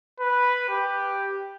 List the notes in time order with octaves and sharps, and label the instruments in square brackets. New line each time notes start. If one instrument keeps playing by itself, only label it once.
[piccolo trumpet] B4
G4